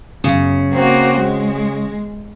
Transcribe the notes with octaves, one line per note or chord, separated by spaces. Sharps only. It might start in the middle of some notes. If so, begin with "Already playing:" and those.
F#2 C#3
A#3 C4 F#4
G#3